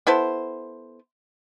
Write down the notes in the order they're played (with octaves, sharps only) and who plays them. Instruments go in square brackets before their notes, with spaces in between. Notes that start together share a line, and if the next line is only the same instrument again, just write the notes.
[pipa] B3 E4 A4 C5